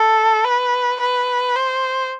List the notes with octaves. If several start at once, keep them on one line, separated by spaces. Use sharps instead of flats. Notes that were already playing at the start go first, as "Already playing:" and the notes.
Already playing: A4
B4
B4
C5